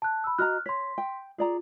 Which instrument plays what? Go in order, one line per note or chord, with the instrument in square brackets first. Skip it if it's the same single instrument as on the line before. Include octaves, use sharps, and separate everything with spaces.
[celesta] A5 F#6
B5 E6
[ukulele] F#4 D#5 A#5 [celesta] F6 F#6
[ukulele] C#5 [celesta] C6 B6
[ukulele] G5
[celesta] F4 [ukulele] G#4 D5 A#5